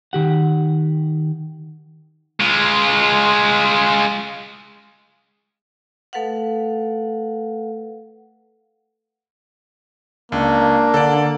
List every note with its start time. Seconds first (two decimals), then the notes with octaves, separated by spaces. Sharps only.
0.13 D#3 G4 F#5
2.40 G#3 F4
6.13 A3 A4 B4 F5 F#5
10.32 C#2 A#3 D4
10.94 D3 A4 D5